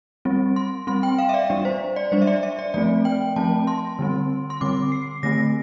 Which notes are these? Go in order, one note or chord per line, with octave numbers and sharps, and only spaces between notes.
G3 C4
C6
G3 C4 C6
G5
F5
E5
D5
G3 D4
C5
D5
G3 D4 C5
E5
D5
E5
D5
F3 A3 C4 D5
G5
F3 A3 C4 A5
C6
D3 G3 C4
C6
D3 G3 C4 D6
C7
D3 A3 C4 A#6